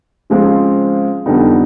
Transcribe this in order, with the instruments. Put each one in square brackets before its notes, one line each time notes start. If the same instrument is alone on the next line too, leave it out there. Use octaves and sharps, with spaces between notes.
[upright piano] C#3 F3 G#3 C4 F4
F2 D3 G3 B3 D#4